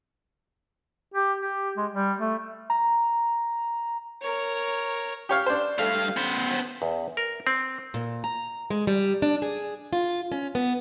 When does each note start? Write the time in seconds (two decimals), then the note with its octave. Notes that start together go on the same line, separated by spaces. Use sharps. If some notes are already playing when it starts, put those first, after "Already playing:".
1.14 G4
1.40 G4
1.77 G#3
1.92 G3
2.19 A3
2.70 A#5
4.21 A#4 C#5
5.29 G4 C#5 F5
5.46 D4 C5
5.79 G2 A3 F5
6.17 B3 C5
6.82 E2
7.17 A#4
7.47 C4
7.94 A#2
8.24 A#5
8.70 G#3
8.87 G3
9.22 D4
9.42 G#4
9.93 F4
10.32 C#4
10.55 B3